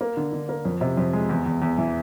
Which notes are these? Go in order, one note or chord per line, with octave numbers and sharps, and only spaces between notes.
A#3
D3
D3
A#3
F2
C3
F2
G#3
E2
E2
E2
E3